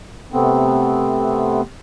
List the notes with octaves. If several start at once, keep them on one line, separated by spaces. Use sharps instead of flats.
C3 A3 B3 C4